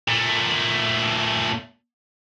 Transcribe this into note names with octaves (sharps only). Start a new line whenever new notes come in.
A#2 A3